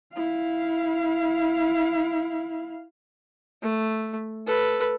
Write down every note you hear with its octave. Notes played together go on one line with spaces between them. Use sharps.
E4 F5
A3
A4 B4